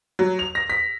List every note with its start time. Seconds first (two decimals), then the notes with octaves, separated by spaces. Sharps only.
0.19 F#3
0.39 F7
0.55 A#6
0.70 B6